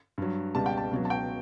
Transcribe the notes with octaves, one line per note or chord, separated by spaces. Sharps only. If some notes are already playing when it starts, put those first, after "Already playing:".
G2 F#3
C#2 B2 G3 A5
G5
A5
C#2 B2 F#3
A5
G5